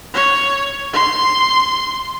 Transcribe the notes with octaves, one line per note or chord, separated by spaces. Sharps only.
C#5
C6